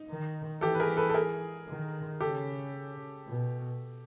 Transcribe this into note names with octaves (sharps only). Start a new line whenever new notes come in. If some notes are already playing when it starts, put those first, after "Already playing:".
Already playing: D#4
D#3
E3 G4 A4
B4
G#4 A#4
A4 B4
A4
G#4 A#4
D#3
C#3 G4 A4
B2